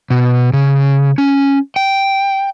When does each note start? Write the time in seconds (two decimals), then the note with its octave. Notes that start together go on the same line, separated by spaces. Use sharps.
0.10 B2
0.53 C#3
1.18 C#4
1.76 G5